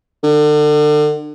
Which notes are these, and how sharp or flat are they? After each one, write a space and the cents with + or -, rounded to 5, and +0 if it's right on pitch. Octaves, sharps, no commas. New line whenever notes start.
D3 +35